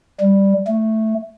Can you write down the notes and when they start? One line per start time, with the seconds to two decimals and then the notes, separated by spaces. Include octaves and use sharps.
0.20 G3
0.68 A3